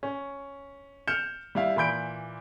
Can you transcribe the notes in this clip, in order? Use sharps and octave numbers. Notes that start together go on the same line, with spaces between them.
C#4
F6 G6 C#7 E7
G3 E4 F5
A#2 E3 B5 G6 D7